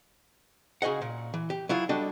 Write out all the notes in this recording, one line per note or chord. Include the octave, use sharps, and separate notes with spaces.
C#3 F#4 G#4 D#5 F#5
A#2
E3
G4
F#3 E4 F4 G#4
G3 D4 F#4 A4 D#5